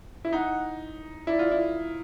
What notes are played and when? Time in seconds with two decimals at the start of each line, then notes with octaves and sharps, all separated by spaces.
0.25 E4
0.33 D#4 F#5
1.27 E4 D5
1.39 F4
1.51 E4